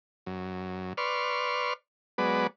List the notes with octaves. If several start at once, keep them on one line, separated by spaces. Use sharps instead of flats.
F#2
B4 D5 C6 C#6 F6
F#3 G#3 B3 B4 D5